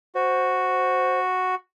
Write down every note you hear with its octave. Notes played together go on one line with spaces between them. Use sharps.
F#4 C5